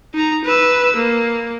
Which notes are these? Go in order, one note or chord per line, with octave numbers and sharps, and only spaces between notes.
D#4 A#5
B4 E6
A#3